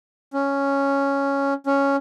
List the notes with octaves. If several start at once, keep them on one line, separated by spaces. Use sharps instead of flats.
C#4
C#4